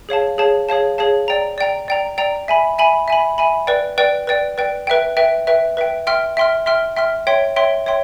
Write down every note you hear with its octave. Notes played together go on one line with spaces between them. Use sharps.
G#4 C#5 F5 A5
G#4 C#5 F5 A5
G#4 C#5 F5 A5
G#4 C#5 F5 A5
D5 G5 A#5
D5 G5 A#5
D5 G5 A#5
D5 G5 A#5
E5 G#5 B5
E5 G#5 B5
E5 G#5 B5
E5 G#5 B5
B4 D5 G5
B4 D5 G5
B4 D5 G5
B4 D5 G5
B4 E5 G5
B4 E5 G5
B4 E5 G5
B4 E5 G5
E5 G5 C6 F6
E5 G5 C6 F6
E5 G5 C6 F6
E5 G5 C6 F6
C#5 E5 G5 C6
C#5 E5 G5 C6
C#5 E5 G5 C6